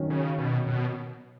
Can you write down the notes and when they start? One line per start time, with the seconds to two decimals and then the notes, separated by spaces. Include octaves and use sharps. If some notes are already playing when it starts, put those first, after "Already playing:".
Already playing: D#3 F#3 C#4
0.10 C#3
0.38 B2
0.67 B2